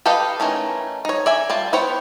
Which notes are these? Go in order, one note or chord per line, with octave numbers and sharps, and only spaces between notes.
G4 A4 B4 D#5 F5
D#3 E3 A3 C#4
D#4 C#5
D5 E5 G#5
G3 F4 A5
B3 E4 C5 C#5 G5